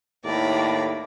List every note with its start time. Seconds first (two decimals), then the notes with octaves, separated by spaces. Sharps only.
0.25 D#2 A2 D5 A#5 B5